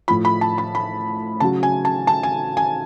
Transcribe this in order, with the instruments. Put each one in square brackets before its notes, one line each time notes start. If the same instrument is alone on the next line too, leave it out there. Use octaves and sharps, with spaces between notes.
[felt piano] A2 F3 B5
B5
A5
B5
B5
C#3 F#3 A5
G#5
A5
A5
G#5
G#5